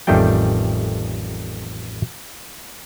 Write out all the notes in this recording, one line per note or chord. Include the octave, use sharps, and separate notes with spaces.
A1 F2 D#3 G3 A3 G5